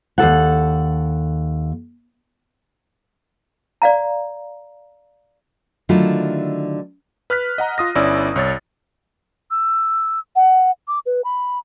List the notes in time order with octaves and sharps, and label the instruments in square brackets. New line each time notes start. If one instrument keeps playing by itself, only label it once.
[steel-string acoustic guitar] D#2 F3 A4 F#5
[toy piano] D5 F5 A#5
[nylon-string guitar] D3 D#3 F#3 A3 E4 F4
[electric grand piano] B4 F6 F#6 B6
D#5 F#5 A#5
F4 D#6 A#6
G1 C#4 E4 D5 E6
C2 C#5 A6
[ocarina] E6
F#5
D6
B4
B5